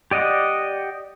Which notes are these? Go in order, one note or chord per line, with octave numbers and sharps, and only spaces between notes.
G4 D5 D#5 F#5